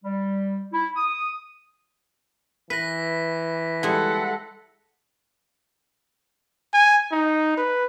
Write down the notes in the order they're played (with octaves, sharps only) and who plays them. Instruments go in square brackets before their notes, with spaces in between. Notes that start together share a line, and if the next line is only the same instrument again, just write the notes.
[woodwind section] G3
E4
D#6
[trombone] E3 [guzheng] B4 [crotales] A#6 B6
[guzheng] G3 G#3 E4 [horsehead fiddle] A4 F#5
[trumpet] G#5
D#4
B4